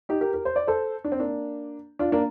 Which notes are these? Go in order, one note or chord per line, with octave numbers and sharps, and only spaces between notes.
D#4 G4
G4 A#4
G4 A#4
C5
D5
A4 C5
D4
C4
A#3 D4
D4 F4
A#3 D4